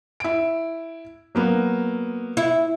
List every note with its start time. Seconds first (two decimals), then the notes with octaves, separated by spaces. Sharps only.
0.20 E4 D7
1.35 F#3 A#3 B3
2.37 E4